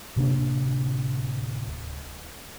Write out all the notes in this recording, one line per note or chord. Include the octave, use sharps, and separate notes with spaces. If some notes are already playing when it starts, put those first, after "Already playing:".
D1 C3 A#3 D4